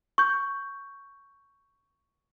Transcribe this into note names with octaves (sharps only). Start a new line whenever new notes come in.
C#6 G6